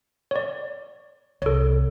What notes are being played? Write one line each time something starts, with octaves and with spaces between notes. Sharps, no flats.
C#5 D5
C2 A4 C#5